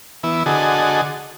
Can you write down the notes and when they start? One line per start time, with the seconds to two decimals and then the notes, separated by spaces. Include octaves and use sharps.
0.23 E3 B3 E4
0.46 D3 F#4 G#4 A4 D#5